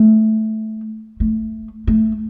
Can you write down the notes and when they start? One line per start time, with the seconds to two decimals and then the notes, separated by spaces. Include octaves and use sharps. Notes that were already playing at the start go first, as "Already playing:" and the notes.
Already playing: A3
1.20 A3
1.87 A3